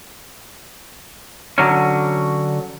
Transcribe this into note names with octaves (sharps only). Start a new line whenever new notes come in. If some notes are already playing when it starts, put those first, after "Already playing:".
D3 F#3 C#4